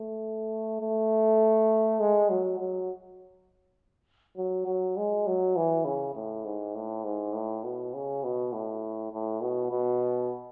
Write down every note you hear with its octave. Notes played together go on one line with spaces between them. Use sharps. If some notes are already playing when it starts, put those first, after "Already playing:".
Already playing: A3
A3
G#3
F#3
F#3
F#3
F#3
G#3
F#3
E3
C#3
A2
G#2
A2
G#2
A2
B2
C#3
B2
A2
A2
B2
B2